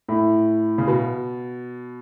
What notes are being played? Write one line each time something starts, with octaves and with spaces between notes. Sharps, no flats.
A2
C#3
B2